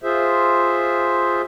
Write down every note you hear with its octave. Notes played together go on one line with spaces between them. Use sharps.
F4 G#4 C5 E5